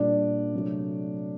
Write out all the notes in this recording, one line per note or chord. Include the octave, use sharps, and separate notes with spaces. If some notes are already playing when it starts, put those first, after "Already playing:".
Already playing: A#2 G3 A#3 D4 D5
C3 F#3 A3